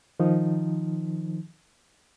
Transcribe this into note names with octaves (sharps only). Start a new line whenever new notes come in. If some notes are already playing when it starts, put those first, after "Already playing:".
D#3 F3 D#4